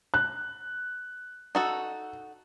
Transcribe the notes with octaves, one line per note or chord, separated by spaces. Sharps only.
F#6
D#4 F#4 A4